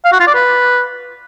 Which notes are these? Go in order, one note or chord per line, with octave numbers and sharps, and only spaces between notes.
F5
F#4
F4
D5
B4